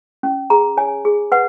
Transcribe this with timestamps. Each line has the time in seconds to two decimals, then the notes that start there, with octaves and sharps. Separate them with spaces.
0.23 C#4
0.50 G#4 A#5
0.77 C#5 G#5
1.05 G#4
1.32 B4 F#5